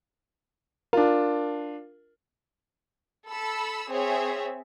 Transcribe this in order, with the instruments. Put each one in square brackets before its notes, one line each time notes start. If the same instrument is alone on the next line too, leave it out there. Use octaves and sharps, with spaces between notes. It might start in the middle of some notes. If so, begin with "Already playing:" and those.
[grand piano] D4 F4 [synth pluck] A#4
[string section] A4 B5 E6
C4 G#4 C#5 E5